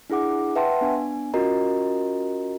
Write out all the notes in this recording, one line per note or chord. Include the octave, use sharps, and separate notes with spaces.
D4 E4 G#4 F#5 D6
B4 E5 F#5 G5 A5 C6
B3 D4 G#5
C#4 F4 F#4 A#4 D#5 A#5